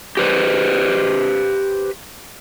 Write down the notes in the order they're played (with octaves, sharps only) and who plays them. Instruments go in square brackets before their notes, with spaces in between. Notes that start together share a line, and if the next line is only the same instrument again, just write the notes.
[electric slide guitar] G4 B4 C5